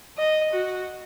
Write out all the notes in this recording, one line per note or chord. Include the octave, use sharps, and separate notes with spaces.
D#5
F#4